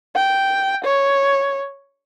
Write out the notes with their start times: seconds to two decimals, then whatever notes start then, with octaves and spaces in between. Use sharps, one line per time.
0.16 G5
0.85 C#5